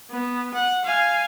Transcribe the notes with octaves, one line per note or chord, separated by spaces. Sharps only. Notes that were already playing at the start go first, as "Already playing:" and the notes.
B3
F#5
F5 G#5